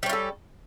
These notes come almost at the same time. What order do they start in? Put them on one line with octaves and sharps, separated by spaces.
G3 C#4 F4 A4